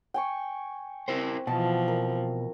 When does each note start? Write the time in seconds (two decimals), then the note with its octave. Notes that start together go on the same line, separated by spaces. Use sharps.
0.14 G5 G#5 C#6
1.08 C4 E4 A#4 C5
1.47 B2 E3 F3 A5
1.88 A#4